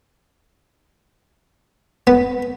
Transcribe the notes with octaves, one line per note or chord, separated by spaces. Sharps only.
B3